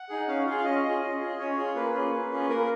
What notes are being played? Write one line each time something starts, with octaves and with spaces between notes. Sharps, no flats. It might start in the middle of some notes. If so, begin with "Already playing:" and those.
Already playing: F#5
D#4 G#4
C#4 F5
F4 G#4 F5
F5
C#4 D#5
F4 G#4
C#4
F4 G#4
C#4 C#5
F4 G#4
A#3 B4
C#4 F4 G#4
A#3
C#4 F4 G#4
A#3 A#4